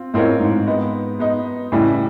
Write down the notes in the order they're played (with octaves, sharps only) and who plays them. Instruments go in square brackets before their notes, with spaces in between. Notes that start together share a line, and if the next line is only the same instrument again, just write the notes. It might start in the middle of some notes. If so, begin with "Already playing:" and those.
Already playing: [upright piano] C4 F4
[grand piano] A2 [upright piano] G#3 C4 F4 A#4 C#5
[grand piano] G#2
[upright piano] G#3 B3 D#4
G#3 B3 D#4
[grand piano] A2 [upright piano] C#3 E3 G3